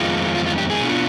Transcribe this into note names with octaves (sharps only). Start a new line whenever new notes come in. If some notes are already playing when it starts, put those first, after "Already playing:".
Already playing: F2 D#3 G#3 B3 F4
F4
F4
G4
G#4
B2 B3 D4 F4